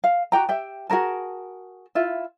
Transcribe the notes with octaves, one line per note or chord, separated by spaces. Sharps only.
F5
F#4 G4 G5 A#5
G4 E5 G5
F#4 G#4 A#4 A5
E4 F4 E5